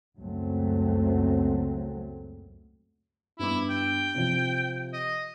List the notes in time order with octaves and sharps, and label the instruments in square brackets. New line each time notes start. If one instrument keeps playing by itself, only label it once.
[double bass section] C#2 F#2 A#2 F#3 A3 C4
[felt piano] G2 B3 D6 [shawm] E4
[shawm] G5
[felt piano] C3 F3
[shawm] D#5